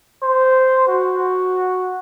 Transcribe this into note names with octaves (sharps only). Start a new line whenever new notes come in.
C5
F#4